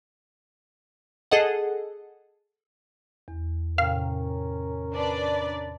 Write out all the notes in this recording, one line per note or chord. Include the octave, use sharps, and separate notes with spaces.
G#4 A4 D#5 F#5
E2
A2 C3 C#4 A#4 F5 G5
D4 B4 D5